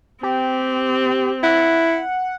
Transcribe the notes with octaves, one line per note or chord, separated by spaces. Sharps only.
C4 G4
E4 F#5